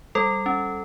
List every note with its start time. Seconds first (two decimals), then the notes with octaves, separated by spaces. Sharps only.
0.15 G3 A4
0.46 C#4